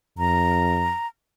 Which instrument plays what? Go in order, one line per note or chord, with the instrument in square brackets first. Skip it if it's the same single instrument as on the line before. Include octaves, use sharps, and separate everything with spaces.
[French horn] F2 [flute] A#5